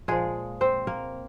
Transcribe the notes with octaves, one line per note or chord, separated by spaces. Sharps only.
A#2 F3 G#3 G#4
C4 C5
A#3 A#4